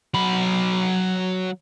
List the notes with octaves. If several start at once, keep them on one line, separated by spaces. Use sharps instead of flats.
F#3 B5